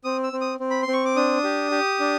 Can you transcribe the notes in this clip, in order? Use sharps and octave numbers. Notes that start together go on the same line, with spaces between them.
C4 D#6
E6
C4
D#6
C4
B5
C6
C4
C#6
D6
D4 D#6
G4
G4
D4